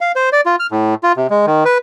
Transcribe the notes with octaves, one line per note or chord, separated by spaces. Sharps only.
F5
C5
D5
F4
F6
A2
F4
C3
G#3
D#3
B4